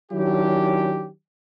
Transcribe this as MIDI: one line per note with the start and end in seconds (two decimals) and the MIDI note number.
0.12 1.09 51
0.12 1.09 54
0.12 1.09 61
0.12 1.09 62
0.12 1.09 64
0.12 1.09 67